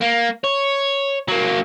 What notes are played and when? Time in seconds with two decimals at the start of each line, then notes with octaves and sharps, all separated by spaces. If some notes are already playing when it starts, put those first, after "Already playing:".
0.01 A#3
0.44 C#5
1.28 F#3 A#3